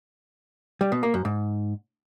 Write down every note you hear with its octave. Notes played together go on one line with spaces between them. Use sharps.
G3
B2
A#3
F#2
G#2